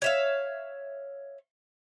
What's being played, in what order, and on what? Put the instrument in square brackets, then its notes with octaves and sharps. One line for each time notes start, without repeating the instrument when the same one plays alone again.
[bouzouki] C#5 E5 F5